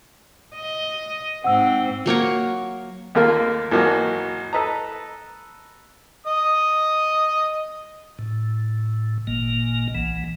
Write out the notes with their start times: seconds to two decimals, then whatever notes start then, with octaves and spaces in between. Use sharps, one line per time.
0.56 D#5
1.44 G#2 C4 F#5 E6
2.06 F#3 A#3 A#4 C#5
3.15 D#2 A3 A#3 F4 A#4
3.71 G#1 E3 F#3 A#3 F#4 A5
4.53 A4 B4 D#5 A#5
6.27 D#5 D#6
8.19 A2
9.27 G#1 A#2 A#3
9.95 B1 E3